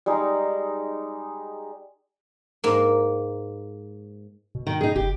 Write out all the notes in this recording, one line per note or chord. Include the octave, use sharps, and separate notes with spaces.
G3 G#3 D#4 G#4
G#2 A#3
B2
D#3
D#4 G#4
F#1 G4